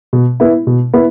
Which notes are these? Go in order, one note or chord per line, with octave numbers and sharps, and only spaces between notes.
B2
B3 E4
B2
B3 E4